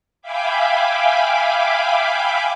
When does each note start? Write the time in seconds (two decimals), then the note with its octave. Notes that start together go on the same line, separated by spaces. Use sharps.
0.22 E5 F5 G5 G#5 B5 D6